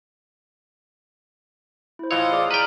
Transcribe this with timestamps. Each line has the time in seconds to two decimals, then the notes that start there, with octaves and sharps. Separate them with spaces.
1.99 E4 C5
2.11 A2 E3 F4 C5 C#5 D#5 E6
2.32 G#4 D5 D6
2.51 B4 G5 A#5 F6 B6